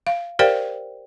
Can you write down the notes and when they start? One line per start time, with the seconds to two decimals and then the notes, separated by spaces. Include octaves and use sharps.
0.07 F5
0.39 G4 A#4 C5 D5 F5 G5